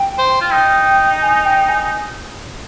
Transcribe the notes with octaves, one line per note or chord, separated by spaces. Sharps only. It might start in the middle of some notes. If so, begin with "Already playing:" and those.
Already playing: G5
C5
F4
D#4
G#5
G5
G#5